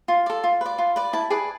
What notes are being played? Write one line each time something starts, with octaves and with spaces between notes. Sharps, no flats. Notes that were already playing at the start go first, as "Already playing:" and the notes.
F4
A4 D5
F4
B4 D5
F4
B4 D5
E4 A5
G#4 B4 D5